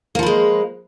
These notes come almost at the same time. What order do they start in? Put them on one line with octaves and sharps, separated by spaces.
A#3 F3 B4 G#3